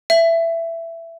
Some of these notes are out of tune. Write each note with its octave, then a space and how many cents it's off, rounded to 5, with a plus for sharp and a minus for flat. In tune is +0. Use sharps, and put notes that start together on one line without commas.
E5 +15